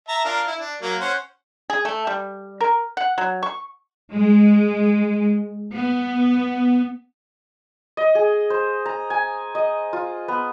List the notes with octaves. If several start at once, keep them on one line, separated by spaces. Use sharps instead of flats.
E5 A5 A#5
D4 F4 A#4
E4
D4
F#3 A#3
C#4 C5 F#5
G#4
A3
G3
A#4
F#5
F#3
C#6
G#3
B3
D#5
G#4
C5
A#5
G#5
D#5
F4
B3